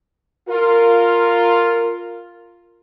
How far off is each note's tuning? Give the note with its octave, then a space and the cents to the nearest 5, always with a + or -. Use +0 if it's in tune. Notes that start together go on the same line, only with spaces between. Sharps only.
F4 +0 A#4 -15